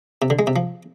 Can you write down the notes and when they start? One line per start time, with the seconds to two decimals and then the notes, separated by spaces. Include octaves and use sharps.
0.22 C3
0.30 D3
0.39 G#3
0.47 C3
0.56 F3